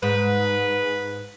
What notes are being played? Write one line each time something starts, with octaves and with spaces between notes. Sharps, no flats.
G#2 B4